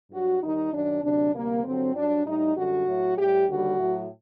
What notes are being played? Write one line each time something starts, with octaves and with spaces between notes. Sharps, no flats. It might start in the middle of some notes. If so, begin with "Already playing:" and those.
G2 F#3 F#4
D#2 D#3 G3 D#4
F#2 D#3 F#3 D4
D2 C3 F#3 D4
D2 C3 G3 A#3
G2 D3 F#3 C4
G2 F#3 D4
A2 G3 D#4
F#2 D3 G3 F#4
A2 F#3
A2 G3 G4
D#2 D3 G3 F#4
A2 F#3